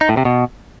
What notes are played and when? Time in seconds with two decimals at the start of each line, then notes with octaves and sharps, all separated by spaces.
0.01 D#4
0.09 A2
0.17 C3
0.25 B2